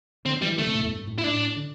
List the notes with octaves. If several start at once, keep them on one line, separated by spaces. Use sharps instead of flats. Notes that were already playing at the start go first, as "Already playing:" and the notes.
D3 C4
E3 G3
D3 A3
C3
A2
E2
G2
A2
E4
A2 D4
D3